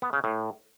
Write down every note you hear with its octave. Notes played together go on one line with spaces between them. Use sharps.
B3
C#3
A2